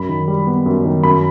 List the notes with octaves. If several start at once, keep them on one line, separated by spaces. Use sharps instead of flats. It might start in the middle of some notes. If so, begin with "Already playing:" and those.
Already playing: F#2 B5
D#3
G3
B3
F#2
D#3
F#2 B5